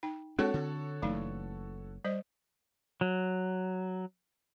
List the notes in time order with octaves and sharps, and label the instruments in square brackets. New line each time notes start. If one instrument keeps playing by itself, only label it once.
[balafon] D#4 G5
[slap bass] G#3 D4 [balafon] C4 [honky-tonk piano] F#4 A4 C#5
[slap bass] D3
[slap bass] F#1 E3 [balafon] F#3 A3 D#4
[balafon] G3 C5 D#5
[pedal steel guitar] F#3